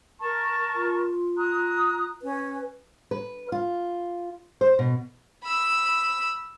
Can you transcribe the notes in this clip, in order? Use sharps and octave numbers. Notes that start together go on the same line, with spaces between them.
A#4 A5 C#6
F4
A#5 D#6 F#6
C#4 B4
B4
F4
C5
B2
B5 E6